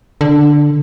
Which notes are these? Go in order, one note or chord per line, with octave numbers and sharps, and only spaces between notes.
D3